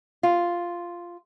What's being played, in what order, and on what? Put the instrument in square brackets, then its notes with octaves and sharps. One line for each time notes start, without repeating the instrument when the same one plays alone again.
[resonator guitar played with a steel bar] F4